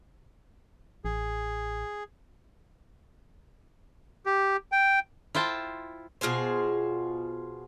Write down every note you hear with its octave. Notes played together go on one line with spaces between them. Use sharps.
A1 G#4
G4
G5
E4 F4 C5 G5 A5
B2 F4 G#4 C5